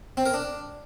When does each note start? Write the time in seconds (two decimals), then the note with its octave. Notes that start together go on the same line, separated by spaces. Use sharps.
0.17 C4
0.26 A#4
0.34 D4